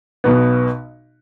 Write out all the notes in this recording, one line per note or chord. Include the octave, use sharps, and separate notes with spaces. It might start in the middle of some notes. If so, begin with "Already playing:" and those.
B1 B2 B3